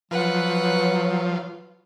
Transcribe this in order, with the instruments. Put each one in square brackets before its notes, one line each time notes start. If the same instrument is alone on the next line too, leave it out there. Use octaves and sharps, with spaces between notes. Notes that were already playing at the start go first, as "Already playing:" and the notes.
[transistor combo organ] F3 [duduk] F#3 [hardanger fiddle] B4 F#5